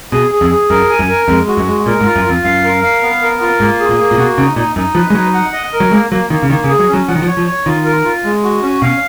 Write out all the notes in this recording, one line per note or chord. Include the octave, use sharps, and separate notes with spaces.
B2 G#4
G#4
F2
G#4
F#2 A#4
G#5
F#2
A#4
F2 G#3
F#4
F#2
G#3
A#2 A#4
G#2
F4
F#2
F2 F4
F#2 F5
A#4
F5
B3
A#4
F4
G#2 A#3
G#4
A#2
A#3
A#2
B2 F#4
C#3 D#4
A#2 D#4
F#2 D#4
F3 B4
G#3
F#3 D#4
F#5
D#5
A#4
F#3
G#3 A#3
F#3 A#3
D#3 A#3
C#3
D#3 A#3
C#3
G#4
F#3
C#4
F#3
F3 F#5
D#3
F3
C#5
F3
C#5
D#3 F4
A#4
F4
G#3
F#4
C#4
B2 F5